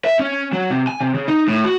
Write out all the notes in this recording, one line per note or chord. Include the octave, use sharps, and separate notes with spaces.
E5
C#4
F#3
C3
G#5
C3
C#3
D#4
A2
F#4